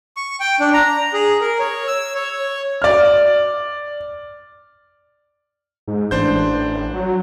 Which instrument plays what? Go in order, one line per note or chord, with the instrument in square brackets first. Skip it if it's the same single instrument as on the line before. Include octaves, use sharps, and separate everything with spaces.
[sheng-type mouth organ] C#6
G5
D4
A#5
G#4
A#4
C#5
E6
C#5
[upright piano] D5 F6
[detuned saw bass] G#2
[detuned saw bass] A1 [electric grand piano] D4 C5 G6
[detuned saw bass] F#3